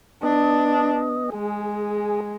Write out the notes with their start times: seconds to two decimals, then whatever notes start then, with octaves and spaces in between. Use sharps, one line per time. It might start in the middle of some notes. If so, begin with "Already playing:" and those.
0.23 B3 D4 D#5
1.32 G#3 G#4